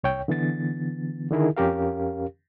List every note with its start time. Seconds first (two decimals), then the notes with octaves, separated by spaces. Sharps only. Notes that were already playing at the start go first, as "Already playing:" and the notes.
0.04 C2 C#5 G5
0.28 D3 E3 B3 A6
1.31 D3 D#3 E4 G#4 A#4
1.57 F2 C#4 G4 A#4 F5